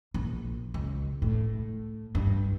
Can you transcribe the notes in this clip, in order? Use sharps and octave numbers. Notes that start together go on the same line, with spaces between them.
A#1
C#2
A2
G2